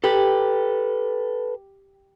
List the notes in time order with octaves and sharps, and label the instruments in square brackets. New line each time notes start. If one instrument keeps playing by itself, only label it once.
[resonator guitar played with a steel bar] G4 [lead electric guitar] A4 B4